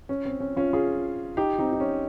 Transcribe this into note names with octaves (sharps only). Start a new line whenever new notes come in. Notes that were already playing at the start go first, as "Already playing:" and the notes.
C#4
C4
C#4
C#4 F4
F4 G#4
D#4 G4
C4 D#4
D#4
C#4